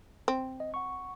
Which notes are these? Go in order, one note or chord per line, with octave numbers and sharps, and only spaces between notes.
C4
D#5
F#5 C#6